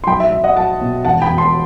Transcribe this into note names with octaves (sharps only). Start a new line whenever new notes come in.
C6
B1 G5 B5
E5
B1 E5
D#5 F#5
F#3 F#5 A5
B2
E1 F#5 A5
G5 B5
E1
A5 C6